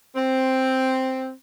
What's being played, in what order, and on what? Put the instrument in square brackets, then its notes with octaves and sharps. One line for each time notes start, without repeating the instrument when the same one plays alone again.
[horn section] C4